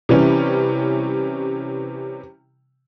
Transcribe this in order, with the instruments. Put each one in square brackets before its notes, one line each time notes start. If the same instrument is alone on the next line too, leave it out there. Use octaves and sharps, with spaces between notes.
[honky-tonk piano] C3 E3 G3 C#4